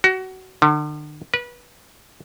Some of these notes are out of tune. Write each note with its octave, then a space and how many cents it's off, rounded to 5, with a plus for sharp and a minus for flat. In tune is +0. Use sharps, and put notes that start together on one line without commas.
F#4 +25
D3 +40
B4 -25